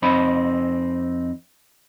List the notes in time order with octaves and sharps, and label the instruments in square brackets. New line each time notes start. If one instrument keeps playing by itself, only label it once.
[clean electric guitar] F2 C4 D#4 B5